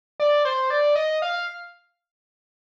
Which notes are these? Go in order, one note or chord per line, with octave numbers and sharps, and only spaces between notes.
D5
C5
D5
D#5
F5